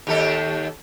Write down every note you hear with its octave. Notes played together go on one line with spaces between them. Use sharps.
D#2 G4 A4